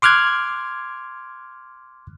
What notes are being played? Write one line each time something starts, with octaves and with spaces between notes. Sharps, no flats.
C6 D6 F6 F#6 G#6